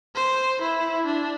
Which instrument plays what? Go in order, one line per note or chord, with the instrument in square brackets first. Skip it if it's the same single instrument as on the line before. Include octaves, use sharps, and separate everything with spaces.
[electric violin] C5
E4
D4